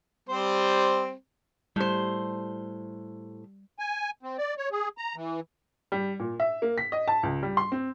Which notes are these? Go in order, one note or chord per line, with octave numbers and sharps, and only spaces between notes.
G3 C4 C5
A2 G3 C5
G#5
C4
D5
C#5
G#4
A#5
E3
G3
A#2
E5
A#3
B6
D#5
A5
C#2
G3
C6
C4